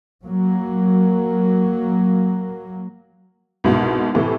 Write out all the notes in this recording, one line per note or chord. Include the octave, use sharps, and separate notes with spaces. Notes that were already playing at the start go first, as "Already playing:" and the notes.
F#3 A#3
C2 G#2 B2
A2 C3 E3